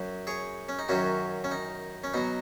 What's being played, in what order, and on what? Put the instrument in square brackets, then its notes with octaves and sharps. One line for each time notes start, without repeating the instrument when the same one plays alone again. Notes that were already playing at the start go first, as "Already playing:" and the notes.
Already playing: [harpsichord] F#2 F#3
G#4 C#5
C#4
D#4
F#2 D#3 F#3 C#4 F#4
C#4
D#4
C#4
B2 F#3 D#4